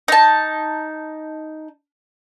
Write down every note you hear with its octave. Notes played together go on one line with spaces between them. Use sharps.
D#4 A5